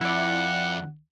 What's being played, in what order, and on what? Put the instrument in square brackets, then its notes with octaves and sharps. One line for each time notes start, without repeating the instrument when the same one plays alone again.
[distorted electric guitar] F2 [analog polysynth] E4 D5 [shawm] F#5